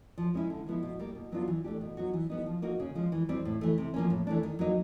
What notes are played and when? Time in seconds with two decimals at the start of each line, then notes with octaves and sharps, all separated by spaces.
0.18 F3
0.34 G#3 C#4 E4
0.50 D3
0.67 F3 G#3 B3 E4
0.83 B2
0.99 G3 A#3
1.15 B2
1.32 F#3 B3 D4 F4
1.48 E3
1.64 A3 D4 G4
1.81 B2
1.97 F#3 B3 D#4 F#4
2.14 E3
2.30 G3 B3 D#4
2.46 F3
2.62 A#3 D#4 F#4
2.80 C#3
2.95 F3 G#3
3.12 E3
3.29 G3 C4
3.45 A2
3.61 E3 A3
3.78 C3
3.94 F3 A#3 C#4
4.10 A2
4.27 E3 A3 D4
4.43 D#3
4.59 F#3 A#3 D#4